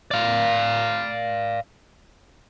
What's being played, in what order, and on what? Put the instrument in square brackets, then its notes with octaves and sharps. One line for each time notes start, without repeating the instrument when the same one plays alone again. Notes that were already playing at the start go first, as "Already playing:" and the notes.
[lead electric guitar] D5 F5